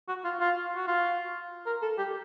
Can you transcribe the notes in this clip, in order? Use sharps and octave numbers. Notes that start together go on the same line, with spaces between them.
F#4
F4
F4
F#4
F4
A#4
A4
G4